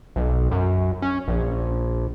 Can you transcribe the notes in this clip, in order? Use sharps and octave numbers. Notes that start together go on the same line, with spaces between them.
B1
F#2
C#4
A#1